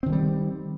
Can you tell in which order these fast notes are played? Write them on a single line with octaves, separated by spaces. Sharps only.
C4 D#3 F3 G3